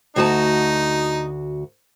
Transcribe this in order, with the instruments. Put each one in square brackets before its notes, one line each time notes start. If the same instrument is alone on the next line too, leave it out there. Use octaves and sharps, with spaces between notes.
[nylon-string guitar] D2 F#4 A5 [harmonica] D#4